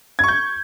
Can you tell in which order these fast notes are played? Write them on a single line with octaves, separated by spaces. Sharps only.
G#6 C#6 G6